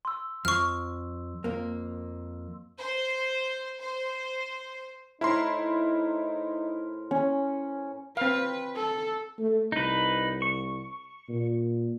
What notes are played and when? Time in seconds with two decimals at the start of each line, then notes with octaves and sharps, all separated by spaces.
0.05 C6 E6
0.45 F2 C#6 F6
1.44 F2 A#3
2.78 C5
3.81 C5
5.21 A2 D#4 E4 A#4 C5 C6
7.11 C#4
8.17 C4 B4 F5
8.75 A4
9.39 A3
9.72 C2 D#4 B4
10.42 C#6
11.29 A#2